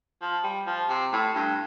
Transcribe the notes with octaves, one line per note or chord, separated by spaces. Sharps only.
F3
G3
F3
C3
A2
G2